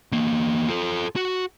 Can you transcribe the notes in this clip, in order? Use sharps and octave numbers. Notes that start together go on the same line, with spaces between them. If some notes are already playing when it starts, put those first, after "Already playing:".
E2 A#3
F4 A4
F#4